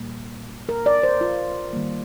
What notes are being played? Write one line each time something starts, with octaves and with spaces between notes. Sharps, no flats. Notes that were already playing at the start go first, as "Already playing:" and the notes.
Already playing: A#2 G3 A#3
A#4
D5
C5
F4
D#3 G3 A#3